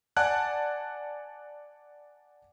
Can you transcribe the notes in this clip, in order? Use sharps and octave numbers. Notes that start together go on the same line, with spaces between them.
D5 F#5 G#5 A5 F#6